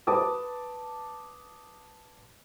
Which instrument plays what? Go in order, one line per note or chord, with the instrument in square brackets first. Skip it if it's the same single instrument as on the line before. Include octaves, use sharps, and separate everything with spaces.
[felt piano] B4 A5 D6 D#6